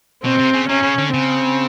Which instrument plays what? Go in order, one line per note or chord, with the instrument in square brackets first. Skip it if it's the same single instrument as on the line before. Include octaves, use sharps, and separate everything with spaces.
[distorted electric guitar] B2 [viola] C4
[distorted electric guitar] C3
C#3
[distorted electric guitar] C3 [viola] C#4
[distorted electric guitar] C#3
D3
[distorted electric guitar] C#3 [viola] C4